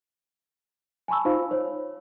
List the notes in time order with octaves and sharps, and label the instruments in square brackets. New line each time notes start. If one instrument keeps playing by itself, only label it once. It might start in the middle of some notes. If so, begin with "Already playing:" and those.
[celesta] G#5 A5 B5 C#6 E6
D#4 F4 C5 F5 B5
C5 C#5